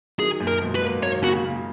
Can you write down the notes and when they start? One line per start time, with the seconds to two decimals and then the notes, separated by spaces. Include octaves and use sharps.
0.19 D#3 F#3 G#4
0.40 F#2 A#2
0.47 A#4
0.61 G#2 B2
0.75 B4
0.82 F#3 A#3
1.03 F#3 A#3 C#5
1.24 A#2 C#3 F#4
1.45 A#2 C#3